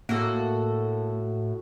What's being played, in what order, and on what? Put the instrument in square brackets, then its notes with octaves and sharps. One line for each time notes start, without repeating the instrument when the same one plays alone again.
[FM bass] A2 [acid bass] A#3 [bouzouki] F#4 A4